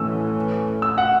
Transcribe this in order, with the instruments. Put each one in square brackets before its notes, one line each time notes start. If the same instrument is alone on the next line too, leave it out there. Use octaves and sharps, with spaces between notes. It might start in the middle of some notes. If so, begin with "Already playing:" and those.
Already playing: [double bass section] A2 E3 A3 C#4 [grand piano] E6
[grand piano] E6
F#5